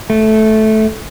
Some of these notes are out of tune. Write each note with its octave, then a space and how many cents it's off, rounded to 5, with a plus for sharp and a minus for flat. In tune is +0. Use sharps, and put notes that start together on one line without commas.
A3 -10